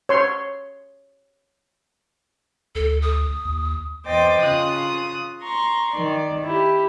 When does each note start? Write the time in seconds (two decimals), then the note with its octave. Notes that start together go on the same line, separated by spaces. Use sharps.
0.09 C#5 C6
2.75 D2 A4
3.02 D#6
3.45 D#2
4.05 E2 C5 D#5 G5 D6 A6
4.41 C#3 F4 D#6 F#6
5.42 A#5 C6 C#6
5.92 D#3 D5
6.45 E4 G4